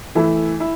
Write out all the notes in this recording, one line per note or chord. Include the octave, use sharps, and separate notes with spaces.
E3 A3 E4
E4